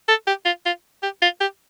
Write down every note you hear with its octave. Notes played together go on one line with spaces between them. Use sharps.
A4
G4
F4
F4
G4
F4
G4